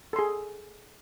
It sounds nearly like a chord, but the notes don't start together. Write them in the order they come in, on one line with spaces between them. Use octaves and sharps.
A4 C6 G#4